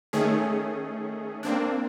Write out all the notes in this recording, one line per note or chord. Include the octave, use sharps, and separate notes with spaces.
D#3 A3 C#4 G#4
A#3 C4 D4